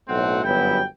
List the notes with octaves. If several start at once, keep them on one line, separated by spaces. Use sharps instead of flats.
B1 A2 F#3 A3 C4 F#5
G1 F#2 F#3 B3 E4 G5